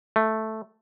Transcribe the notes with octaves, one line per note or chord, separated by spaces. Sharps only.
A3